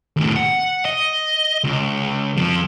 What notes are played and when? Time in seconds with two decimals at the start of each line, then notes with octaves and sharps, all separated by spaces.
0.17 D#2 A2
0.36 F#5
0.85 D#5
1.64 C#2
2.37 F3 C4